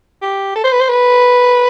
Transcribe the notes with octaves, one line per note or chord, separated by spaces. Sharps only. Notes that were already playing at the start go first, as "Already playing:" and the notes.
G4
A4
C5
B4
C5
B4